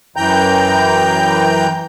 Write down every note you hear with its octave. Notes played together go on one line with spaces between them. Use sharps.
F#2 E3 G5 A#5 G6